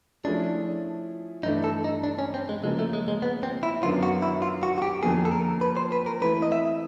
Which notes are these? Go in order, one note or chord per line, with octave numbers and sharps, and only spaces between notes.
F3 A3 C#4 D4 E4 G#4
G2 E3 A3 D4 D#4
A4
D#4
D4
C#4
C4
G#3
C#3 F3 G#3 A#3
A3
G#3
G#3
B3
C4
E4
F#2 D#3 F#3 B3 D4 F4
F#4
E4
F4
F#4
F#4
G4
F2 D3 F3 A#3 G#4
A4
A#4
B4
C5
B4
A#4
E3 A3 C4 E4 B4
D#5
E5